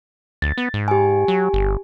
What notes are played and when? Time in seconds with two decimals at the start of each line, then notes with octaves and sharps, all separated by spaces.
0.42 D2 A6
0.58 B3
0.74 G#2
0.88 G4 G#5
1.28 F#3
1.54 G1